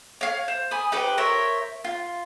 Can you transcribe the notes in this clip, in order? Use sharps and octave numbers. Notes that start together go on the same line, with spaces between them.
C#5 F5
C5
G#5 B5 D#6
D#4 G4 B4 C5
A#4 C5 C#5 E5
F4